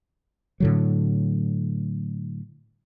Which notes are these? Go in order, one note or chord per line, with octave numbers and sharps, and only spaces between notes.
A2 D3 F#3